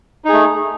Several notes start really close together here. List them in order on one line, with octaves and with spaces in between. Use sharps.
D#4 G#4 A3